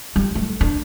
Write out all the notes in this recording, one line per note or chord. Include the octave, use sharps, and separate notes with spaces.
G3
A3
D4